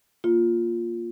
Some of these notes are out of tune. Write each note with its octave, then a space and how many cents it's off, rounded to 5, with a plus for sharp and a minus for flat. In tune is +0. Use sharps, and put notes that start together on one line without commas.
A#3 +0 F4 +0